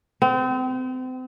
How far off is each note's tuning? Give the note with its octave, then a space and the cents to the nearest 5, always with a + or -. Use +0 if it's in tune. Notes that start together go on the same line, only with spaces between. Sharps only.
C4 -35